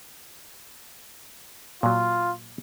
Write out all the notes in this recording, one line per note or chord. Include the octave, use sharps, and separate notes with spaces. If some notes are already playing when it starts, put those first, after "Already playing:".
A#2 F#3 F4